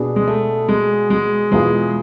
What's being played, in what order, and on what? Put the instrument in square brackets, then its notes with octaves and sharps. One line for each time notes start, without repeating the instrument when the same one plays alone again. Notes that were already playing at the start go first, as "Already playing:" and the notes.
Already playing: [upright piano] B2 B3 D4 G#4
[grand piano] G#3
A3
G#3
G#3
[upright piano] E2 B2 B3 F4 G#4 [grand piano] G#3